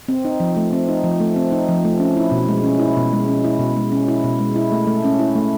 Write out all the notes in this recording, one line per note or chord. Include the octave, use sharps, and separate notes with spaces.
C4
D#4
F3
A3
C4
D#4
F3
A3
C4
D#4
F3
A3
C#4
E4
B2
G#3
C#4
E4
B2
G#3
C#4
E4
B2
G#3
C#4
E4
B2
G#3
E4
A3
A3
C#4
E4
A3